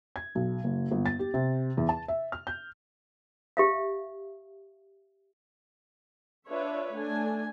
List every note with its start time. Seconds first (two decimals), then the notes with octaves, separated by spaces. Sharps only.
0.16 G#6
0.35 B1
0.64 F#1
0.91 G1
1.06 A6
1.19 G4
1.34 C3
1.77 E2
1.89 A5
2.08 E5
2.32 F6
2.47 G6
3.57 G4 E5 F5
6.48 D4 F4 B4 C#5 E5
6.94 A3 D4 G#5